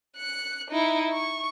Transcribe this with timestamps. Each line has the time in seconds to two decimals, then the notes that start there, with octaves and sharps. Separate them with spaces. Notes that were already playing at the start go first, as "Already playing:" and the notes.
0.17 F#6 C#7
0.71 D#4 E4
1.12 C#6